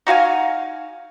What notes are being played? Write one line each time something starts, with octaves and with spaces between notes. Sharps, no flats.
D#4 F#4 F5 G#5